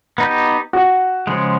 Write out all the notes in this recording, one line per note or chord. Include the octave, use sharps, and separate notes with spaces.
B3 D#4 G4
F#4
C#3 F3 G#3